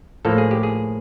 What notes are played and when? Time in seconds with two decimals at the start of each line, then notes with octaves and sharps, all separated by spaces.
0.25 A2 F3 A#3 A4
0.38 G#4
0.51 G4
0.63 G#4